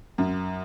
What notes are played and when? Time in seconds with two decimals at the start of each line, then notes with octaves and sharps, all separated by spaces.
0.18 F#2